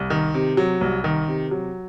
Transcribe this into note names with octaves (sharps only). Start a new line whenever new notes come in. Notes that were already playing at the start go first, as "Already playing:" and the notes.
Already playing: C2
D#3
C3
F#3
C2
D#3
C3
F#3